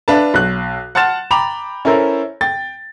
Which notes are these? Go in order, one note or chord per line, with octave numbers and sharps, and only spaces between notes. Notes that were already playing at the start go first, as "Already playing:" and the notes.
D4 B4 E5 F5 A5
B1 F#6
F#5 A5 C6 F6 A6 E7
G5 A#5 B5 D6 F7
C#4 E4 A4 A#4 C5
G5 A6